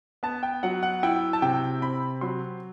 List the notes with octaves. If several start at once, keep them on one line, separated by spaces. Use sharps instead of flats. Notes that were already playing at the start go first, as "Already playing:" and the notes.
B3 A5
G5
F#3 F#5
F#5
E4 G5
A5
C3 G5
C4 B5
F#3 C6